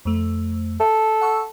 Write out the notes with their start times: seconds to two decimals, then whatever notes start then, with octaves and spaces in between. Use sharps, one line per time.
0.05 F2 A3
0.80 A4
1.21 F#5 C#6 E6